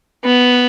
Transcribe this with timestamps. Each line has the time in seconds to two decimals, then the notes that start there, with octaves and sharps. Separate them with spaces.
0.24 B3